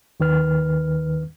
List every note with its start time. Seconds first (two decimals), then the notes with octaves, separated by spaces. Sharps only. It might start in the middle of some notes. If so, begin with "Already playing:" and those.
0.20 D#2 D#3 B4 F6